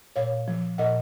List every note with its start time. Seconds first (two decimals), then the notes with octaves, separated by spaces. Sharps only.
0.16 A#2 C#5 F5
0.48 F3
0.78 A#2 D#5 F#5